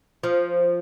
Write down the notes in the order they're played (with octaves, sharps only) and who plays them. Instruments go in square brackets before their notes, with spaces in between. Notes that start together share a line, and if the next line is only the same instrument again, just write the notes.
[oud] F3